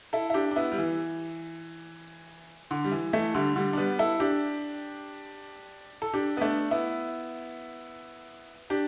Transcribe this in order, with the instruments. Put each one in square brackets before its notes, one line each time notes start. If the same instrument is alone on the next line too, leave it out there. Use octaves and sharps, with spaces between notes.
[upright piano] E4 A4
E4
D4 G4
D4
B3 E4
G3
E3
D3
G3
E3
E3 A3
D3 G3
D3 G3
D4
G3 B3
E4 A4
D4 G4
A4
D4 G4
B3
A3 D4
B3 E4
D4 G4